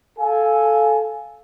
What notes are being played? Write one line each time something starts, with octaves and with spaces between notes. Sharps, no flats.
A4 F5 G#5